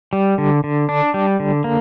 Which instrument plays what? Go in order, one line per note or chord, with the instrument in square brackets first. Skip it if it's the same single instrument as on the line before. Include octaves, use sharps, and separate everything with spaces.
[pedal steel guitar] G3
D3
D3
D4
G3
D3
A#3